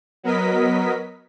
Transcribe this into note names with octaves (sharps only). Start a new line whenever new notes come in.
F#3 B3 A#4 D#5 B6